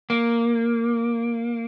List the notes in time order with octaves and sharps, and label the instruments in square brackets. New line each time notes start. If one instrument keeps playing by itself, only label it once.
[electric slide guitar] A#3